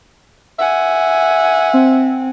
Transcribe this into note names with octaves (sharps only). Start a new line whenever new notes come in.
E5 F#5 G#5
C4